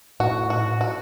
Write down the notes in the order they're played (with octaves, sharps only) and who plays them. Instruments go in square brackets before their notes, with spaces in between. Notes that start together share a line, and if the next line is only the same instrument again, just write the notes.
[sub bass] A2 [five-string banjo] F#4
[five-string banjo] F#4
F#4